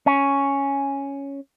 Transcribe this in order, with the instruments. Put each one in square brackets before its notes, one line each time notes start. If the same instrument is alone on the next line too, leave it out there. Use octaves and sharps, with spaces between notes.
[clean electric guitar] C#4